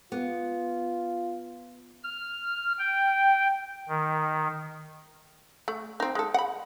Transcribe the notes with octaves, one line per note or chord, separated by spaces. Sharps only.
B3 F4
F6
G5
D#3
A3
C4 D#4
G#3 A4
F#5 B5